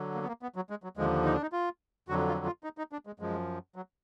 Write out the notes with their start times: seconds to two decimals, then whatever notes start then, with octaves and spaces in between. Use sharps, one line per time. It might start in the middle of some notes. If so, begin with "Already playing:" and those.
Already playing: D3 F#3
0.15 A#3
0.23 B3
0.28 A#3
0.42 B3
0.56 F#3
0.70 G#3
0.83 F#3
0.97 D#2 D3 F3 G#3
1.25 D#4
1.34 D4
1.42 D#4
1.53 F4
2.09 F2 D3 F#3 F#4
2.28 F4
2.46 F4
2.64 D#4
2.78 D#4
2.92 D4
3.07 G#3
3.20 F#2 F3 G#3
3.76 F#3